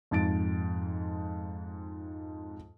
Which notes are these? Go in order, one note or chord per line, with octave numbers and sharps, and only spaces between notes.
F2 G#2 A6 D7